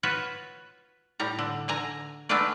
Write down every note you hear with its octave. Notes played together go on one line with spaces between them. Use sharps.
F4 F#4 B4 C#5
A2 G3 A#5
D3
D3 G#5 A#5
G#3 A3 B3 D4 F4 D5